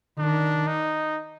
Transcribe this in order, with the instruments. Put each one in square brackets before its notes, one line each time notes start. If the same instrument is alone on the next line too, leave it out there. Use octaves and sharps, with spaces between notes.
[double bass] D#3 [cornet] D4
[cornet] D#4